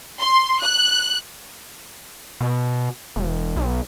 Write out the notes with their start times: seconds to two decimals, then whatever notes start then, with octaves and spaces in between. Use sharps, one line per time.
0.19 C6
0.61 F#6
2.41 B2
3.16 E1
3.57 B1